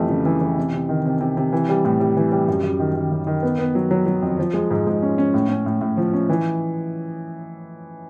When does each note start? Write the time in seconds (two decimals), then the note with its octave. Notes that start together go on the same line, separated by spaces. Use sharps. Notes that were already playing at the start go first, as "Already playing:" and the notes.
Already playing: F2 E3 G3 A3
0.10 C#3
0.25 E3
0.41 E3
0.57 C3
0.73 C3
0.89 D#3
1.05 C3
1.21 C3
1.37 C3
1.52 E3
1.69 G3
1.85 A2
2.00 G3
2.17 E3
2.32 G3
2.48 F#2
2.63 F#2
2.80 D#3
2.96 D#3
3.12 F#2
3.27 D#3
3.43 B3
3.59 B3
3.75 F#3
3.91 F#3
4.06 F#3
4.22 F2
4.39 F3
4.54 G#3
4.71 G#2
4.87 G#2
5.02 C#4
5.18 C#4
5.34 A2
5.49 C#4
5.66 A2
5.81 A2
5.97 F3
6.13 C#4
6.29 E3